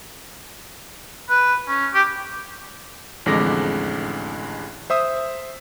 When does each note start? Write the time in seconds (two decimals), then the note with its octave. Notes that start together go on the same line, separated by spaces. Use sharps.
1.29 B4
1.68 C#4
1.94 G4
3.26 A1 F2 D3 G#3 D6 A#6
4.90 C5 E5 D#6